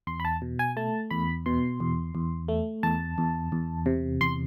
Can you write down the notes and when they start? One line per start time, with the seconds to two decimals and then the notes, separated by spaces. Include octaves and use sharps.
0.07 E2 C6
0.20 B5
0.25 A5
0.42 B2
0.59 G#5
0.77 A3 A5
1.11 E2 B5
1.46 B2 C6
1.80 E2
2.15 E2
2.48 A3
2.83 E2 A5
3.18 E2
3.52 E2
3.86 C3
4.21 E2 C6